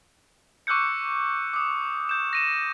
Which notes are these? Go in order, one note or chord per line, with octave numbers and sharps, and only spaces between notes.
C#6 D6 E6 F#6 G6 C#7
D6 D#6
G6 E7
A#6 D#7 E7